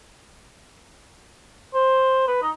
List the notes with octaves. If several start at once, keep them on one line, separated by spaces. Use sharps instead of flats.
C5
B4
D#4